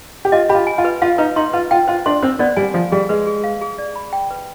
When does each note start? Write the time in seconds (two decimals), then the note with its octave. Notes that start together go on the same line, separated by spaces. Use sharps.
0.25 G4
0.32 F4 D#5
0.49 G4 B5
0.55 F4
0.67 G#5
0.78 F4
0.85 B4
1.02 F4 F5
1.18 D#4 B4
1.36 D#4 C6
1.53 F4 B4
1.71 F4 G5
1.88 F4 C5
2.06 D4 C6
2.23 C4 C5
2.39 B3 D5
2.57 G3 G#5
2.74 F3 F5
2.92 G3 G#4
3.09 G#3 B4
3.27 G#4
3.44 F5
3.61 G#4
3.78 D5
3.96 B5
4.13 G5
4.31 B4